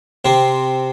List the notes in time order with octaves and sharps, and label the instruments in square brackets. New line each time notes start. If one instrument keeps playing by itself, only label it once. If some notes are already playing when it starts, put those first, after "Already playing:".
[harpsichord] C3 C4